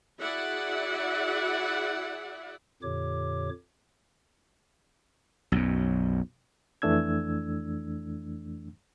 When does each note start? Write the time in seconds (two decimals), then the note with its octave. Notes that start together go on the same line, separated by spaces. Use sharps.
0.19 E4 F#4 G#4 D5 E5 F#5
2.83 F2 A#2 D3 G4 C#5 D6
5.52 B1 F#2
6.82 F2 E3 A3 D4 E6 G#6